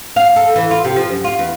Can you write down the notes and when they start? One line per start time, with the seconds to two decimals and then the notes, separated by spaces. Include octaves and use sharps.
0.16 F5
0.36 A4
0.56 E3
0.71 F4
0.85 C3
0.96 F3
1.09 F#2
1.24 F4
1.39 E2